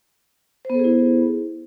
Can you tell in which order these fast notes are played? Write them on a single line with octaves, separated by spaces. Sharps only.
C5 B3 A4 G#4 E4